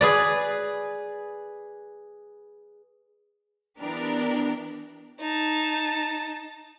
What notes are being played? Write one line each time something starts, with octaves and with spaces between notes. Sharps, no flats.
G#4 B4 D5
E3 B3 D4 G4 A#4
D#4 A5